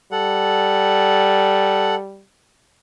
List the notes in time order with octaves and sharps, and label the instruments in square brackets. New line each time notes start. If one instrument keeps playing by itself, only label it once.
[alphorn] G3 [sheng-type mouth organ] A4 F#5